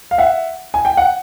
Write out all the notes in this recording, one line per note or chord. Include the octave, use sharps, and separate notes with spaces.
F5
E5 F#5
G#5
G5
F#5